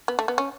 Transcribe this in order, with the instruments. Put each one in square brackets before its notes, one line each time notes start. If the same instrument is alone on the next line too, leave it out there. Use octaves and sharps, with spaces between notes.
[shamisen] B3
A3
B3
C#4